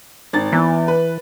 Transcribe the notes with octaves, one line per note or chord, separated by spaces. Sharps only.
G#1 A6
E2 E3
B4